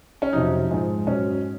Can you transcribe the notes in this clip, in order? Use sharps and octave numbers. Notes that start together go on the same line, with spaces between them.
C#4
F2 C3 F#3 D#4
G#2 F3 G#3
G#2 F#3 C#4